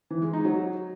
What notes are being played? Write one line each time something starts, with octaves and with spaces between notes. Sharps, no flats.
E3
G#3
D#4
F#3